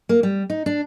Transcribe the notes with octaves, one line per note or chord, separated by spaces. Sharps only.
A#3
G3
D#4
D4